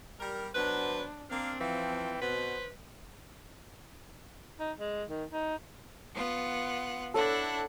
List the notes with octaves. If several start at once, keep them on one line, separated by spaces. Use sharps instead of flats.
G3 A#4
B2 F#3 D4 B4 C5
A#3 C4 D4 F5
E3 F3 G5
B2 B4 C5
D#4
G#3
D#3
D#4
B3 F4 F#5
D4 E4 A4 C#5 F#5